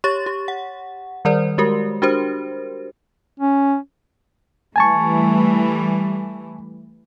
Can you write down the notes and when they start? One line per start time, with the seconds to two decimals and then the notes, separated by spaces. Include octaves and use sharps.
0.04 G4 C#5 C#6 A6
0.26 G4
0.48 F#5
1.25 D#3 G3 A#4 C5 D5
1.58 G#3 F#4 G4 A#4
2.02 D4 F#4 G4 A#4 C5
3.40 C#4
4.76 E3 G3 A3 G#5 A5 C#6